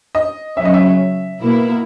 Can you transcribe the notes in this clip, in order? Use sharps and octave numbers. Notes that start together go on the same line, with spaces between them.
D#5
C#3 F#3 C#4 E5
D#5
E5
B2 A#3 E4